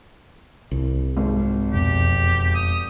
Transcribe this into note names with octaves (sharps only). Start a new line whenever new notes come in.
C2
G#1
E1 F2 B2 G4
D#6